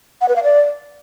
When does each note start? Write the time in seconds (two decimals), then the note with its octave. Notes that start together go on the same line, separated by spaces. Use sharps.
0.21 F#5
0.28 B4
0.36 F5
0.43 D5